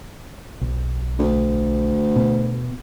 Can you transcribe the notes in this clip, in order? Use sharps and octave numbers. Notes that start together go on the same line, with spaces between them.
B1
D2
B2